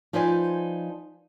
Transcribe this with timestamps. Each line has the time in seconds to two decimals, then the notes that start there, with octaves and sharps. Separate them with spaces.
0.13 F3 D#4 B4 C5 D5 G#5